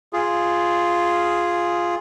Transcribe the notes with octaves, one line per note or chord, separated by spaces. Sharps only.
F4 G#4